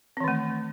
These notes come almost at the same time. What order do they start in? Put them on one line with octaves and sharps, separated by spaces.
C4 E3 D#3 A3